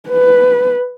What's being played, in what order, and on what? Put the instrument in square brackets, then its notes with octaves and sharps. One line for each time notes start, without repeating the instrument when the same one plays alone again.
[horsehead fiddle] B4